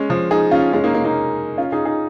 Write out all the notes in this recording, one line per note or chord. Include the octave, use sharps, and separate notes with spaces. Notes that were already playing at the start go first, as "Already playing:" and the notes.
Already playing: G#3 C#4
F3
D#4 G#4
C#4 F4
G#3 C#4
A#3 D#4
A#3 D#4
A#3 D#4
C#4 F4
D#4 G#4
D#4 G#4